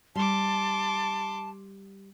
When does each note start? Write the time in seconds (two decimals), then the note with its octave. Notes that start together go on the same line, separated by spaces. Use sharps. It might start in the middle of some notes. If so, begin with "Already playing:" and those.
0.15 G3 A5 C6 D6